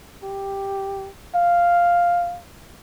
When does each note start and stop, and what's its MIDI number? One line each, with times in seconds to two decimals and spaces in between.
0.23 1.09 67
1.35 2.40 77